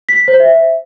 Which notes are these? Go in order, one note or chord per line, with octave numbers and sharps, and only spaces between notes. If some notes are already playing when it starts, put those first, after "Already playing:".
B6
C5
E5